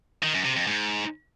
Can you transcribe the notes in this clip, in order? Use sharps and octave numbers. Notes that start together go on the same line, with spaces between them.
D#3
F#2
C3
F2
G#2